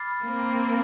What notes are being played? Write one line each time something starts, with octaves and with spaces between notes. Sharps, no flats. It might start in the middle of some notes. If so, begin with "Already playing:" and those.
Already playing: B5 D6 F6 A6 C7
A#3 C4